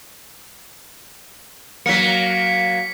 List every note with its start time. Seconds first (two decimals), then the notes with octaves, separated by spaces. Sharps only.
1.86 F#3 A#3 B6 C#7